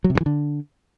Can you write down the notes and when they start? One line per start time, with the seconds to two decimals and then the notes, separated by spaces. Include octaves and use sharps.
0.04 F#3
0.10 C3
0.15 G2
0.21 E3
0.26 D3